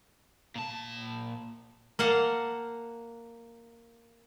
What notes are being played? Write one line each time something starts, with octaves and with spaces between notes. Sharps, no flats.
A#2 A5
A#3 F5 F#5 A5 A#5